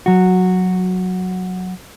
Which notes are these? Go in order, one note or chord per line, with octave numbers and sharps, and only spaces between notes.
F#3 F#4